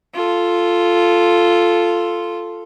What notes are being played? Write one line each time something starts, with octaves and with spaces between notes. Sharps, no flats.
F4 A4